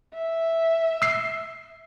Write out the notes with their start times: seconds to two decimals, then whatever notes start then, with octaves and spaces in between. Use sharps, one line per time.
0.14 E5
1.02 E6 C7